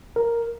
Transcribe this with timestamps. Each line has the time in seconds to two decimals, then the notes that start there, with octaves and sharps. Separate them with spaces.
0.16 A#4